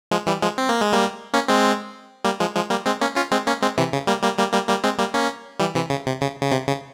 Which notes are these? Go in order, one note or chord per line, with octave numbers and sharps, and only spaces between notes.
F3 G#3
E3 G3
F3 G#3
C4
A#3
G#3
G3 A#3
A#3 C#4
G#3 C4
G3 A#3
F3 G#3
F3 G#3
G3 A#3
G#3 C4
A#3 C#4
C#4 F4
G#3 C4
A#3 C#4
G#3 C4
C3 E3
C#3
G3 A#3
G3 A#3
G3 A#3
G3 A#3
G3 A#3
G#3 C4
G3 A#3
A#3 C#4
E3 G3
C3 E3
C#3
C3
C#3
C#3
C3
C#3